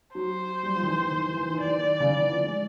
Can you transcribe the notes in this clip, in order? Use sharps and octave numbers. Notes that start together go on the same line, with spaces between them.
F#3 C5
G3
F3
D#3
E3
D#3
D#3
E3
D#3
E3
D#3
E3
D#3 D5
E3
D#3
C#3
D3
E3
F3
G#3